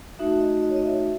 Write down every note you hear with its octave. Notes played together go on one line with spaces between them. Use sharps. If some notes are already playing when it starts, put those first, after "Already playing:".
A3 D#4 F#4 E5
D#5
D#5
C#5
D#5
E5